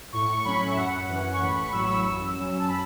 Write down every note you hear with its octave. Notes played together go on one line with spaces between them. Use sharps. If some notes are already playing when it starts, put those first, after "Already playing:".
A2 C#6
C#6
F#3 C#4 B5
E5
F#2 F#5
E3 C#4
C#6
A1 B5
C#6
A2 F#3 E6
E6
F#2 E6
F#3 C#4
A5
B5